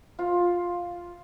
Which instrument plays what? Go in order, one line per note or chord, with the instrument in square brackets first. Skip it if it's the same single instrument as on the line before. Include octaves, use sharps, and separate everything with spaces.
[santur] F4